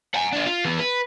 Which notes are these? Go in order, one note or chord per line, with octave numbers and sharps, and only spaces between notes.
F#5 G#5
D4 F4
F4
E3 B3
B4